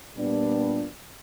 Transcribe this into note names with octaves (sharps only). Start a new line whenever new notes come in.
A#2 G3 B3 D4